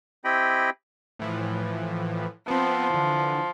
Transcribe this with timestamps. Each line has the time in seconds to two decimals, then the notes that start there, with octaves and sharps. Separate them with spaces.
0.25 C4 E4 G4 D#5 G5 B5
1.19 A2 E3 F3
2.48 F3 B3 C4
2.90 D3 E3